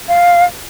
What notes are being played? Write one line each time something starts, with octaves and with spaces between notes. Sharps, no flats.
F5